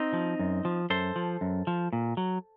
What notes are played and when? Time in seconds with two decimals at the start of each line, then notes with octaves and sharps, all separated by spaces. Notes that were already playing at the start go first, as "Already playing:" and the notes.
Already playing: C4 D#4
0.13 F3
0.39 F#2
0.65 F3
0.90 F#2 A4 C5
1.16 F3
1.41 F#2
1.67 F3
1.93 A#2
2.17 F#3